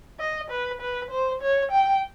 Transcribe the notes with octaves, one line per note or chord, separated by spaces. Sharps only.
D#5
B4
B4
C5
C#5
G5